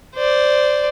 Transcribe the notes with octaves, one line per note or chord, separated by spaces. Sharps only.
C5 D5